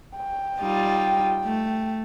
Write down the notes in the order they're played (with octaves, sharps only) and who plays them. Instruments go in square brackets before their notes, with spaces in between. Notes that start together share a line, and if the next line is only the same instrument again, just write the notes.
[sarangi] G5
[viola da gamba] G3 D#4 F4
A3